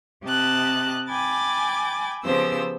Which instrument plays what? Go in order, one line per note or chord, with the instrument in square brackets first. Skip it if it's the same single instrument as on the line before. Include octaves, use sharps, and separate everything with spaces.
[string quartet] C3 G4 D#5 A5 F#6
G5 G#5 B5 D6 A6
C#3 F3 B3 G4 C5 E6